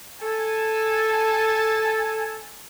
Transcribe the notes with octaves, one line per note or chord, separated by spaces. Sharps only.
A4 G#5 A5